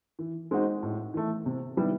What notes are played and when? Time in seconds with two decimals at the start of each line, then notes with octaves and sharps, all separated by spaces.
0.19 E3
0.51 G#3 C4 D#4 F#4
0.83 A2
1.14 E3 A3
1.46 C3
1.77 D#3 G3 B3 E4